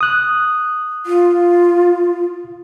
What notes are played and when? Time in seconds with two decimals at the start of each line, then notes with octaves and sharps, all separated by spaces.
0.01 D#6 F#6
1.06 F4